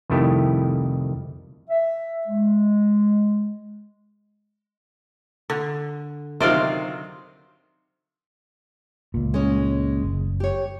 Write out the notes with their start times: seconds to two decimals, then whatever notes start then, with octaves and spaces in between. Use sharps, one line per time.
0.09 C2 F2 D#3 A3 E4 G4
1.70 E5
2.28 G#3
5.50 D3
6.41 C3 D#3 F#3 C5 D5 F5
9.14 C#2 A#2
9.34 G#3 C#4
10.02 F#1
10.40 G4 C#5